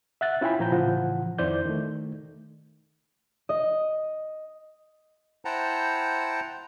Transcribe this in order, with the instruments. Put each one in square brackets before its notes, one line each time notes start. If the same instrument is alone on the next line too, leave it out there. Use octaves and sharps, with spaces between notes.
[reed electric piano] E5 F#5 F#6 A6
C#4 E4 F4 G5 G#5 B5
A#2 F3 A#5 G6
A2 C#3 E3 F3 F#5
F2 D#3 E4 C5 D5 G6
D#3 A3
[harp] D#5
[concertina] E4 C5 F#5 G5 A5 A#5